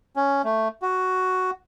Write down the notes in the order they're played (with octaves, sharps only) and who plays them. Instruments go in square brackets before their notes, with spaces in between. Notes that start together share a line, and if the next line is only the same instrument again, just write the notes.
[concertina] C#4
A3
F#4